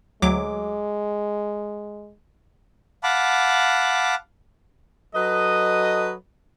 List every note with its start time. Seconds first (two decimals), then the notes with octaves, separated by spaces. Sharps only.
0.22 D2 F#3 G#3 D6
3.03 F5 F#5 A5 B5 D6
5.15 F#3 A4 B4 D#5